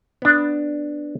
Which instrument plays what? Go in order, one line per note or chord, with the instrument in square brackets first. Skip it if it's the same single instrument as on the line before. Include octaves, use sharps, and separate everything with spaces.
[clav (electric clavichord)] B3 D4